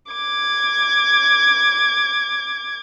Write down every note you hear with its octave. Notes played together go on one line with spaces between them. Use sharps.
D6 G#6